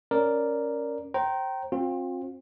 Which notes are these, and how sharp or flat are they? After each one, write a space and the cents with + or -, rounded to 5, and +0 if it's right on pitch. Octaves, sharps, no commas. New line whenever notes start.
C#4 +0 A#4 +0 D5 +0
C5 +30 G5 -20 A#5 +0
C4 +25 F4 +40